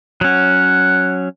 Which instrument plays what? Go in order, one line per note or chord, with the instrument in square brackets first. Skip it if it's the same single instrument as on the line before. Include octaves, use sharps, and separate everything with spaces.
[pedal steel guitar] F#3 C#4 [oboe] F#5